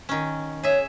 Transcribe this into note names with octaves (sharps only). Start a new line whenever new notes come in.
D#3 C#4
G#4 C#5 E5